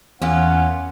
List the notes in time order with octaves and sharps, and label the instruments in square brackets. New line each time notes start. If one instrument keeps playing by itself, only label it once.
[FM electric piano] E2 [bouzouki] A#3 B3 F4 [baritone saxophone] C#4 [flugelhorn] F#5